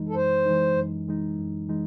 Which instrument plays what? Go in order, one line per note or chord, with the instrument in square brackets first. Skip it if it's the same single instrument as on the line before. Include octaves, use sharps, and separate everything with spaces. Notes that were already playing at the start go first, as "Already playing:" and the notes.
Already playing: [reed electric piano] F#2 E3 G#3 D#4
[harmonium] A4
[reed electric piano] F#2 [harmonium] C5
[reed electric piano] E3 G#3 D#4
F#2
E3 G#3 D#4
F#2
E3 G#3 D#4